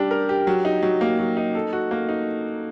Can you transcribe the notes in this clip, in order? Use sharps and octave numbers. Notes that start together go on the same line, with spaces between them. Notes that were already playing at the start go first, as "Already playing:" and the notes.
Already playing: G3 D4 G4
A#4
G4
F#3
D#4
F#3
A#3
F#3
D#4
A4
F#4
A#3
D#4